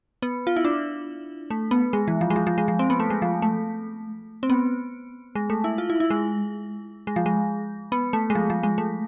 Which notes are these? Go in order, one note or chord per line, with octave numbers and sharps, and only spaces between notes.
B3
F4
E4
D4
A3
B3
G#3
E3
F3
G#3
F3
F3
G#3
F3
C4
B3
A3
G#3
F3
A3
C4
B3
G#3
A3
E4
F4
E4
E4
G#3
G#3
F3
G#3
B3
A3
G#3
F3
F3
G#3
A3